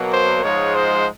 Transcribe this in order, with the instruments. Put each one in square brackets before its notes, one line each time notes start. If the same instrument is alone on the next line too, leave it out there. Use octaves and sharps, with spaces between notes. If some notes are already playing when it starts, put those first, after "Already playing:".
Already playing: [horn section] B2 F#3 A#3
[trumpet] C5
[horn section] G#2 F3 G#3 [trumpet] C#5
[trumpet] C5